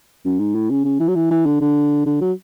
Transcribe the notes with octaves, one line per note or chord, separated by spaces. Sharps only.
F#2
G#2
A2
C#3
C#3
E3
F#3
E3
E3
D3
D3
D3
F#3